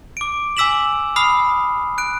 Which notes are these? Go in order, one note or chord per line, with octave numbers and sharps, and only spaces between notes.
D6 D7
G#5 D6 E6 B6 E7 F#7
B5 D#6 F6 C7
F#6 D7